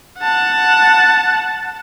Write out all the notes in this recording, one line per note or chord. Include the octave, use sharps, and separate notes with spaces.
F#5 A5